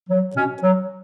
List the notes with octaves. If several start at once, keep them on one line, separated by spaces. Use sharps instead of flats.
F#3
B2 C#4
F#3